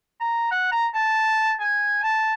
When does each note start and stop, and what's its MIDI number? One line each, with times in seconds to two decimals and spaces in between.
0.20 0.46 82
0.51 0.69 78
0.72 0.87 82
0.94 1.54 81
1.60 2.01 80
2.03 2.34 81